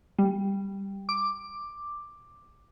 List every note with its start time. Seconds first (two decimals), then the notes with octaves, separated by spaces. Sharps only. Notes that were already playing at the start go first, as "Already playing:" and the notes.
0.19 G3
1.09 D6